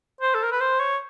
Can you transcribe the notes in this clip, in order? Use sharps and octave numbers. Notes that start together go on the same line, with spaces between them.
C5
A4
A#4
B4
C5
C#5